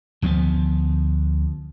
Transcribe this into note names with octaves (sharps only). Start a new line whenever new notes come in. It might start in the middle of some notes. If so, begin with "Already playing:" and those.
D2 F3 G#3 B3